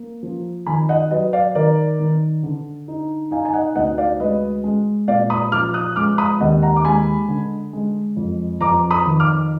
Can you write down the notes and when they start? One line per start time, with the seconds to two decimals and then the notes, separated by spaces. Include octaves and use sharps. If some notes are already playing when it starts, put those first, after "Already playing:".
Already playing: A#3
0.23 F3
0.66 D#3 G#5 B5
0.89 D#5 F#5
1.11 F#3 B4 D#5
1.33 D5 F5
1.55 D#3 A#4 D5
1.99 D#3
2.43 D3
2.88 D#4
3.31 D#4 F5 G#5
3.45 G#5
3.54 D#5 F#5
3.75 D2 D#5 F#5
3.98 D5 F5
4.20 G#3 B4 D#5
4.64 G#3
5.08 A#2 D5 F5
5.30 B5 D#6
5.52 F3 D6 F6
5.74 D#6 F#6
5.96 G#3 D6 F6
6.18 B5 D#6
6.40 D#2 D#5 F#5
6.63 F#5 A#5
6.76 D6
6.84 G#3 G#5 B5
7.28 D3
7.73 G#3
8.17 F2
8.61 F2 A#5 D6
8.91 B5 D#6
9.06 D#3
9.20 D6 F6